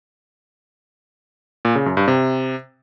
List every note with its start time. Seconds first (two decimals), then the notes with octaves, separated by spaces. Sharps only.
1.65 A#2
1.75 C#3
1.86 F#2
1.97 G2
2.08 C3